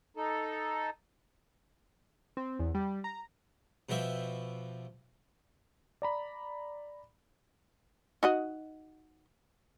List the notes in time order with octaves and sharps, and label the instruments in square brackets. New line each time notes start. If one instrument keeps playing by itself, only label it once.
[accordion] D#4 A4
[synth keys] C4
E2
G3
A#5
[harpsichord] B2 F3 G4 E5
[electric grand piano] D5 A#5 B5
[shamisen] D#4 F#4 D#5